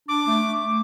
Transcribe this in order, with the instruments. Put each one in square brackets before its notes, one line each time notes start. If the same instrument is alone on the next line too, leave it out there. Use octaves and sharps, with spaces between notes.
[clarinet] D4 [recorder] D6
[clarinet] A3